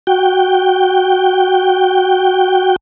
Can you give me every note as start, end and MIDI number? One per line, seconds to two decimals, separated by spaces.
0.07 2.76 66
0.07 2.76 79